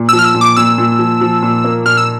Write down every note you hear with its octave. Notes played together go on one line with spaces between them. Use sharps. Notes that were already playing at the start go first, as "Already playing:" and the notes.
Already playing: A#2
F3 E6
F6
E6
A#2
D6
A#2 E6
A#2
F3
F3
A#2
A#3
A#2 F6
E6